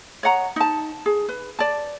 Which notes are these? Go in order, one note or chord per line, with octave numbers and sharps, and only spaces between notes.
C#5 D#5 F#5 A#5
D#4 A5
G#4
B4
D5 A5